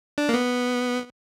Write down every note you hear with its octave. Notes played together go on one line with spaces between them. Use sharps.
D4
A#3
B3